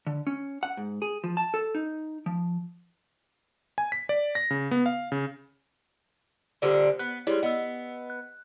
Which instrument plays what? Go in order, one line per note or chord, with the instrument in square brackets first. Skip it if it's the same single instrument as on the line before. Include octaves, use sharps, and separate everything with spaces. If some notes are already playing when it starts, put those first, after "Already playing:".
[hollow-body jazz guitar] D3
C#4
F#5
G#2
G#4
F3
A5
A4
D#4
F3
[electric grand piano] G#5
B6
D5
A#6
C#3
B3
F5
C#3
[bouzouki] A#2 D3 G3 [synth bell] G4 C5 D5
[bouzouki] B3 [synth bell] F#6
[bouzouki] G3 G#3 [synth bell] E4 C#5 D5
[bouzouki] B3 [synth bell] D#5 E6
[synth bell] F#6